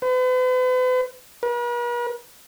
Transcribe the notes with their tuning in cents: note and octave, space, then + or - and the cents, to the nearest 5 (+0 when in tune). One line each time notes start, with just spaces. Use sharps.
B4 +45
B4 -45